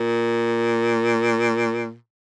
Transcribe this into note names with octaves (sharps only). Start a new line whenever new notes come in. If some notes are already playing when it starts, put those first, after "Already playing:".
Already playing: A#2